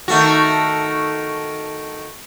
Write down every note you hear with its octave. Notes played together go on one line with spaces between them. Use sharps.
D#3 A3 F#4